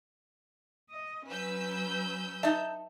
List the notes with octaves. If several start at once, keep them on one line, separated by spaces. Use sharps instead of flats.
D#5
F#3 C#4 B4 E6 G6
D#4 D#5 E5 A5